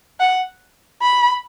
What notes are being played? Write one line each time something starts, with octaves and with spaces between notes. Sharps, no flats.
F#5
B5